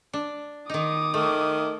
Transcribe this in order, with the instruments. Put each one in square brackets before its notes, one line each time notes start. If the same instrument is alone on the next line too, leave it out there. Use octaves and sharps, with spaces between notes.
[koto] D4
[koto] D#3 D#4 [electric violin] D6 D#6
[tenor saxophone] D#3 [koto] A3